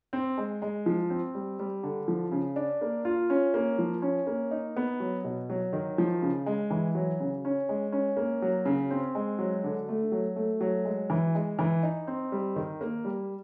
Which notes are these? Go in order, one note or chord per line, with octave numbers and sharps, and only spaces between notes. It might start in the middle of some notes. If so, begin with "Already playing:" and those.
C4
G#3
G#3
F3
C4
G3
G3
D3
F3
C#3
D4
A#3
F4
C#4
A#3
F3
C#4
A#3
D#4
B3
F#3
B2
F#3
D#3
F3
C#3
G#3
E3
F#3
C#3
C#4
G#3
C#4
A#3
F#3
C#3
C4
G#3
F#3
D3
A3
F#3
A3
F#3
G#3
E3
G#3
E3
D#4
C4
G3
D#3
A#3
G3